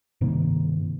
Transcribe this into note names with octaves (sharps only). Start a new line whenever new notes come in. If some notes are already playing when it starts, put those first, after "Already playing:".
G2 C3 D#3 A#3